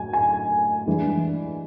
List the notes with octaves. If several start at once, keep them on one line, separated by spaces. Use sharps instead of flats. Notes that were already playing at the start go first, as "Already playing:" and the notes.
Already playing: A2 F#3 G#5
G#5
G2 E3 G#3